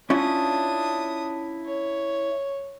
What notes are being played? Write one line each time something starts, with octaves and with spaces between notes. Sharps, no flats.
C#4 D4 E4 F4 D#6
C#5